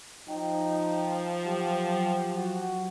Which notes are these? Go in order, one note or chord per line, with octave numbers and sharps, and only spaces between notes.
F3 D#4 G5
F#3 G4
F#4